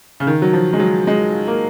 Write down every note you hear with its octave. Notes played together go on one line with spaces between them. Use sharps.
C#3
D#3
F#3
F3
G#3
F#3
G#3
A#3